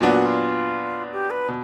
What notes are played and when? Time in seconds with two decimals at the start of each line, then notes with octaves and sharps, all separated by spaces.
0.01 A#2 F#3 B3 D4 F#4
0.14 F#4
0.26 F4
1.12 G4
1.30 B4
1.48 B2